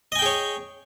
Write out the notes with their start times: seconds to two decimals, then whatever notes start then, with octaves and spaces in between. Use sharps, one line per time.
0.12 D#5
0.15 G#5
0.19 G5
0.22 G#4
0.26 C#5